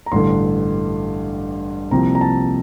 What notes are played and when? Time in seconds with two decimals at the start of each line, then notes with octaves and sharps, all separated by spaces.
0.06 A#5
0.12 A1 G2 D3 C6
1.91 C2 C3 F3 A#3 A#5
2.15 A#5
2.21 A5